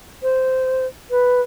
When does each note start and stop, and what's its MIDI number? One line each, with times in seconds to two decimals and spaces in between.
0.23 0.86 72
1.10 1.41 71